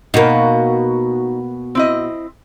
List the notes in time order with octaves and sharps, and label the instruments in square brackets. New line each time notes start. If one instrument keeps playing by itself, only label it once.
[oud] B2 A#3 [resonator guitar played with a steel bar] D#4 F#4
[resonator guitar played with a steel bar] C4 E4 D#5